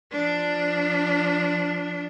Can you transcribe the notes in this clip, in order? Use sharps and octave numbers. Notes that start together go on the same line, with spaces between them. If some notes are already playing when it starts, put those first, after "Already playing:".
F3 D4